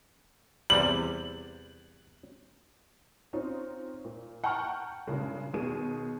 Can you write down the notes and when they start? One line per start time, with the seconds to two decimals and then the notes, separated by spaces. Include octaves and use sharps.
0.70 E2 C3 G3 F#7
3.33 C4 C#4 D#4 F4
4.05 A#2
4.44 F#5 G5 A5 A#5 C#6 F6
5.07 G2 A#2 C#3 G#3
5.54 D#2 B2 G#4 D#7